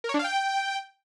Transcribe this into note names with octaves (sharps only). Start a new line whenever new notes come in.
A#4
C#5
D4
F5
G5